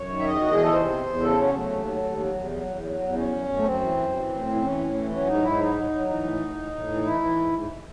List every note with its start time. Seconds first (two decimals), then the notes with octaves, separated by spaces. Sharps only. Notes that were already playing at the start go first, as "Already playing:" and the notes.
Already playing: F#2 C#5
0.08 D#3
0.19 E5
0.25 E2 D#5
0.41 E2 F#4
0.52 G#4
0.57 E3
0.63 A4
0.73 C3 C5
0.89 E2
1.06 E2
1.22 C#3 A4
1.38 F#3 C#4
1.54 F#3 A3
1.70 D#2
1.87 F#3
2.03 D#2
2.19 F#3
2.35 E2
2.51 F#3
2.67 E2
2.83 F#3
3.00 E2
3.16 F#2 C#4
3.32 F#2
3.48 F#2
3.57 A3
3.64 F#2 C4
3.81 E3
3.97 F#2
4.13 E3
4.29 A2
4.46 E3
4.62 E3 C#4
4.78 A2
4.94 E3
5.10 F#3 C#4
5.26 G#2 D#4
5.43 G#2 E4
5.58 F#3 D#4
5.75 F#3
5.91 F#3
6.07 E3 D#4
6.24 A2
6.40 A2
6.56 A2
6.72 A2
6.88 E3
7.04 E3 E4
7.21 E3
7.36 G#2
7.53 G#2